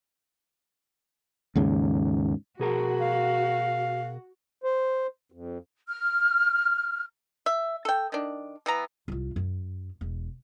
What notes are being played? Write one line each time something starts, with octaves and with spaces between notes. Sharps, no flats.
D#2 G#2 C#3
B2 F#4 G#4 A#4
F5
C5
F2
F6
E5
A4 G5
D#3 D4
E3 B3 A#5
C2 F4
F#2
E1